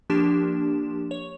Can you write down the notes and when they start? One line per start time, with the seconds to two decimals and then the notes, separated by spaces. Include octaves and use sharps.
0.10 F3 A#3 D4 G4 C6 E7
1.11 C#5